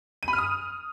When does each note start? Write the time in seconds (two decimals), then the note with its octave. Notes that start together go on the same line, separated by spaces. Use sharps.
0.23 D#7
0.28 B5
0.33 F6
0.38 D#6